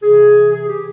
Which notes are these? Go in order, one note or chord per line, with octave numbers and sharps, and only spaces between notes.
C3 E3 G#4
G#4
G4